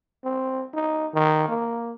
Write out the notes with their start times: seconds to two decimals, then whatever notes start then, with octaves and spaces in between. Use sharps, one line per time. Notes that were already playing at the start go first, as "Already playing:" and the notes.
0.24 C4
0.74 D#4
1.14 D#3
1.48 A#3